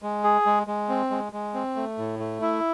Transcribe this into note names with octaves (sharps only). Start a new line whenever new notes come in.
G#3
G#4
G#3
G#3
C4
G#3
G#3
C4
A3
A2
A3
E4